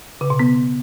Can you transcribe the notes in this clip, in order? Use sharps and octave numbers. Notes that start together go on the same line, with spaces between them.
C#3
B2
B3